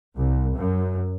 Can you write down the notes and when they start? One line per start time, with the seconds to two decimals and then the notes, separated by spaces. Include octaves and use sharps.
0.18 C2
0.57 F#2